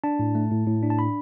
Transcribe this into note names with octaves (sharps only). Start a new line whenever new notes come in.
D4 A5
A2
A3
A2
A2
D4
A5
B5